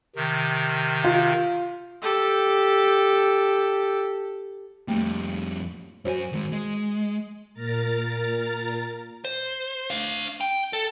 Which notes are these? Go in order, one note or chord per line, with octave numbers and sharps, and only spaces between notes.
C3 D#3
F4
G4 A4
F2 G3 A3 A#3
F#2 F#4 C5 C#5 G#5
D#3 G#3
G#3
A#2 A#4 A#5 A6
C5
D4 F5
G5
A4